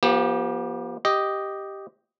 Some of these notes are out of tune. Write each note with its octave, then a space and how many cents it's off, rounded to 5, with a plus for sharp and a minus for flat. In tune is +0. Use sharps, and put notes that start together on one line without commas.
F3 -10 B3 -45 G4 +0
G4 +0 D#5 +0